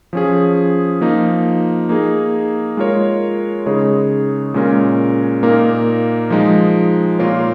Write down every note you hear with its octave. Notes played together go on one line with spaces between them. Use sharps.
F3 C#4 G#4
F3 A#3 D#4
A#3 D#4 G#4
G#3 F4 A#4 C#5
C#3 G#3 D#4 G#4 C#5
A#2 G#3 C#4 A#4
A#2 A#3 D#4 A#4
F3 G#3 D#4
A#2 A#3 F4 A#4 C#5